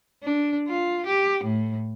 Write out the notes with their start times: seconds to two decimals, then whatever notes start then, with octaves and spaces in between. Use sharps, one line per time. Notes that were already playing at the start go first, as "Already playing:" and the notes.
0.23 D4
0.68 F4
1.06 G4
1.43 A2